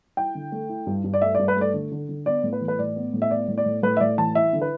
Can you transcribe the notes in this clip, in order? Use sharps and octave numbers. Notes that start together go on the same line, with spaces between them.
E4 G5
D3
A3
E4
G2
G2
D5
A3 E5
D5
G2
B4
A3 D5
D3
D3
D3
B3 D5
A2
B4
E3
B4
A2 D5
B3
A2
E5
B3 D5
A2
D5
A2
A2 B4
E5
A2 D5
E3 A5
E4 E5
D3
B4